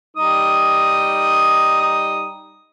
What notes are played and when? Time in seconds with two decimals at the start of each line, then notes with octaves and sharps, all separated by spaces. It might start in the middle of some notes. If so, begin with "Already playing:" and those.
0.17 G3 D#4 D#6